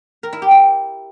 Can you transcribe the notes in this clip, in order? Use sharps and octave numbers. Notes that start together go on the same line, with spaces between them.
A#4
E4
G4
E4